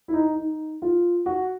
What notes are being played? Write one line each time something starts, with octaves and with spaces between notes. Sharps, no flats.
E4
D#4
D#4
F4
F#4